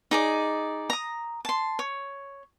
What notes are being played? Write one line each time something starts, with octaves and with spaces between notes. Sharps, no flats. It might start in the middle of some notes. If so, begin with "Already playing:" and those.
D#4 G#4 D5
A#5 D#6
A5 C6
C#5